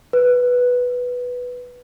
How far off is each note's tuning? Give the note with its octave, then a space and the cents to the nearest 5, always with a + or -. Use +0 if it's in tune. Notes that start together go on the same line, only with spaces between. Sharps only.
B4 +0